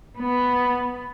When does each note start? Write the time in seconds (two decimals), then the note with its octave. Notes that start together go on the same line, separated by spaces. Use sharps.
0.16 B3